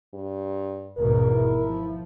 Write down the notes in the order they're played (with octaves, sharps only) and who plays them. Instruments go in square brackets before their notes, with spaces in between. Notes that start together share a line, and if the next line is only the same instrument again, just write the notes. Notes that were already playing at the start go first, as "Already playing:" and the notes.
[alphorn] G2
[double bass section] G#1 E2 B2 [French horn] A#4
[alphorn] E4
[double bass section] F3